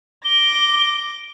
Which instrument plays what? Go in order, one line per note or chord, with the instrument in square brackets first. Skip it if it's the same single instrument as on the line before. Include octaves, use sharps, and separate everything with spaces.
[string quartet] D6 A#6 [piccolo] G7